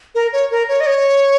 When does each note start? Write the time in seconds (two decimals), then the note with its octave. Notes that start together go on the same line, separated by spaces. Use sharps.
0.15 A#4
0.33 C#5
0.51 A#4
0.69 C#5
0.80 D#5
0.86 C#5